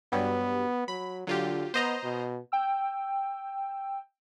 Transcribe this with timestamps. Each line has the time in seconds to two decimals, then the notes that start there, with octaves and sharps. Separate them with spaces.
0.13 G2 F#3 G3 B3
0.88 F#3 B5
1.27 D3 F#3 F4 G4
1.74 B3 C5 D#5 A#5
2.03 B2
2.52 G5 E6